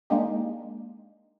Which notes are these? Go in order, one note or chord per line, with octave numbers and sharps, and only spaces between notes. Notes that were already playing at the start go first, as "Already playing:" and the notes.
G#3 A#3 D4 D#4 G4